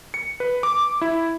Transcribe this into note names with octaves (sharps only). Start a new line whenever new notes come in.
C#7
B4
D6
E4